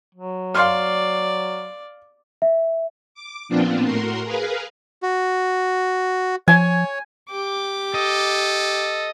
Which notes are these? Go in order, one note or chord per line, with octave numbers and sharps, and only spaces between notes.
F#3
D5 F5 C6 F6
E5
D6
A#2 F3 B3 C4 D4 F4
A2 F#4 A#4 C6
G#4 A#4 B4 F5
F#4
F3 C#5 G#5
G4 D6
A4 D#5